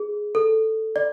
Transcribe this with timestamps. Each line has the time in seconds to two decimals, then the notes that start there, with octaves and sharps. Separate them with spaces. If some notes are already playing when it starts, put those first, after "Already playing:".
Already playing: G#4
0.35 A4
0.96 D5